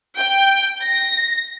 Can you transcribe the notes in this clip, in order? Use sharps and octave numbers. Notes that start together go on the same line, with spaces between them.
G5
A#6